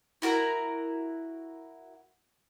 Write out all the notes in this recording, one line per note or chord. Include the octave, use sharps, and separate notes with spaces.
E4 F#4 A#4 A#5